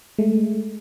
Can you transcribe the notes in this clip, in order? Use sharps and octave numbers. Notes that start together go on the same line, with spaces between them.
G#3 A3